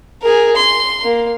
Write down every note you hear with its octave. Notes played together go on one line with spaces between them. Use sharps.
G#4 A#4
C6
A#3